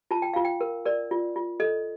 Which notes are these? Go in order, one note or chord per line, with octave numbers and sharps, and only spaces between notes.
F4 A5
G5
F4 F5
G5
A#4
A#4 D5
F4
F4
A4 D#5